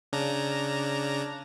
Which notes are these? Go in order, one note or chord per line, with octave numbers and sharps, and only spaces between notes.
C#3 D4 A#5